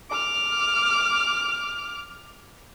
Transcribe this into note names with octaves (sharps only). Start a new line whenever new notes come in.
D6 F6